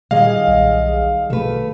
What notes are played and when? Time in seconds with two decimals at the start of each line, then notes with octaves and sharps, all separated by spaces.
0.11 A#2 D#3 G3 G#4 D#5 F5
0.48 B1
1.30 B2 A3 B4